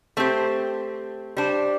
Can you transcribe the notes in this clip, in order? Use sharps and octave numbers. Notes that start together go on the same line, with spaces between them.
A3 C4 G4 C5
G3 D4 C5